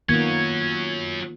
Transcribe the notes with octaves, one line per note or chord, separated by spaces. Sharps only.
D#3 F#3 A#3 B3 C#4 F4 G#6